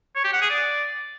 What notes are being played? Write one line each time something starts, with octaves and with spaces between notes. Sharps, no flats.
C#5
G4
F#5
G#4
D5